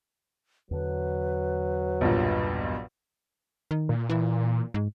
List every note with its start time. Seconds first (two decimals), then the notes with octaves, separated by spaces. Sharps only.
0.71 E2 D3 F#3 B4
2.01 B1 G2 A#2
3.71 D#3
3.89 A#2
4.10 E3
4.74 G#2